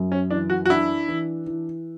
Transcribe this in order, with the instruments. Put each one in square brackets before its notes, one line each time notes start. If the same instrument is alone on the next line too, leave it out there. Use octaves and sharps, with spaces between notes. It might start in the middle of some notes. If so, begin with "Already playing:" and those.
Already playing: [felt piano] F#2
[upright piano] C#4
[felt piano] E3 [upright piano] D4
[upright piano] F#4
F#4
[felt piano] D4 [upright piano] E4
[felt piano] E3
E3